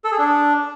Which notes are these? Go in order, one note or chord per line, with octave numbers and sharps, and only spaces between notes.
A4
G#4
D4